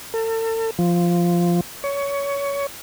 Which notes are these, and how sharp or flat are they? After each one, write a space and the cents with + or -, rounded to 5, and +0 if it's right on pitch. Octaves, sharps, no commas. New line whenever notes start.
A4 +40
F3 -5
C#5 +20